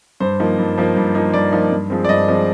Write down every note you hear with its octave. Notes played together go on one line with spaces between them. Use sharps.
G2 C5
F3 A#3 D#4
G2
F3 A#3 D#4
G2
F3 A#3 D#4
G2 D5
F3 A#3 D#4
G2
F3 G#3 C4
D5
G2 D#5
F3 G#3 C4